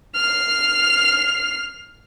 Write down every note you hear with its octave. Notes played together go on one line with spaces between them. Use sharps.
F6 C7